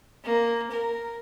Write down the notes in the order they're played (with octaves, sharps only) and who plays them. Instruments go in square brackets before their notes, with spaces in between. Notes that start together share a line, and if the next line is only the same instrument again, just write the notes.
[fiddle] A#3
A#4